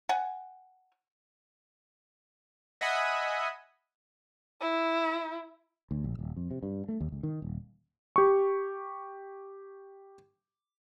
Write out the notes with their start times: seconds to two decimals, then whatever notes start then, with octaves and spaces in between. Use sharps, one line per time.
0.09 F#5 G#5
2.81 D#5 E5 F#5 G#5 B5 D#6
4.61 E4
5.91 D2
6.04 A#1
6.19 D#1
6.36 F2
6.51 C3
6.63 G2
6.89 A3
7.01 D#2
7.12 C#2
7.23 D#3
7.42 D#1
8.16 G4 C#6